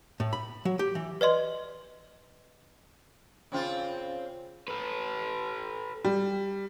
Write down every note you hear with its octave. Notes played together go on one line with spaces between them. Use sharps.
A2
B5
F#3
G4
E3
B4 D5 D#5 C6
C#3 C4 F4
A4 B4
G3